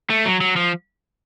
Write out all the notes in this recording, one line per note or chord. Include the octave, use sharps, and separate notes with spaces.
A3
F#3
F#3
F3